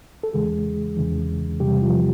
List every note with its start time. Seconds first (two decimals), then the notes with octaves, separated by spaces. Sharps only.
0.23 A4
0.33 E2 C#3 E3 G#3 G#4
0.97 E2 C#3 E3
1.60 E2 C3 E3 G3 G4
1.82 F3 F4